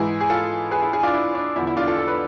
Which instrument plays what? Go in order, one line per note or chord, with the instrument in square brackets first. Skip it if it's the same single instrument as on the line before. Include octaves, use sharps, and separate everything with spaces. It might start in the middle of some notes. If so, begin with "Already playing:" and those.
Already playing: [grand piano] G#2 E3 E4 G#4
G#4
F4 A4
G#4 B4
E4 G#4
E4 G#4
D4 F4
E4
D4
E2 D3 F3 E4
E4
D4 F4
F4 A4
A4
B4